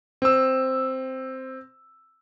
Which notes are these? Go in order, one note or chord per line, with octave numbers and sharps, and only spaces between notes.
C4 E6